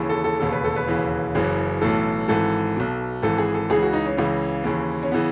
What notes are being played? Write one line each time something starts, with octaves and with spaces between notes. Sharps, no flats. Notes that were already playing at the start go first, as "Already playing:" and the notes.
Already playing: D#2 C#3 E3
A4
A4
E1 D#2 C#3 A4
B4
A4
B4
E1 D#2 C#3 E3
F#1 F#2 C#3 E3
B1 A2 E3 A4
G#1 G#2 E3 A4
B1 B2
G#1 G#2 E3 A4
G#4
A4
C#2 C#3 E3 G#4
F#4
D#4
C#4
C#2 C#3 E3
D#2 C#3 E3
C#4
C#3 E3 B3